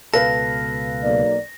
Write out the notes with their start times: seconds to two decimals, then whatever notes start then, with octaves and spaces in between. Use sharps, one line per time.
0.14 C#2 B2 A4 B4 F5 A#6
1.03 B1 A#3 D5